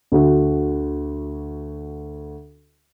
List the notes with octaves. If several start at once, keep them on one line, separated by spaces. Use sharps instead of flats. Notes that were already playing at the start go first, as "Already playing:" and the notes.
D2 F#4